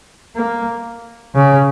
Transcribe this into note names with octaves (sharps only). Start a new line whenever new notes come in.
A#3
C#3